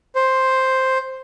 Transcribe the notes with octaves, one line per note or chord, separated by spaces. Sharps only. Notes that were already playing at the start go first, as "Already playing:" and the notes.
C5